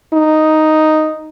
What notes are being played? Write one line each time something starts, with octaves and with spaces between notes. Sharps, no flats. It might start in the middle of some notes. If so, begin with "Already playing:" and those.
D#4